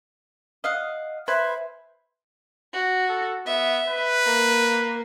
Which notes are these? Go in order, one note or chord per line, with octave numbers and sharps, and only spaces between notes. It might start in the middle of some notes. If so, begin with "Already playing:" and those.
D#5 F5 F#5
B4 C5 E5 G#5
F#4
A4
B3 E5
B4
A#3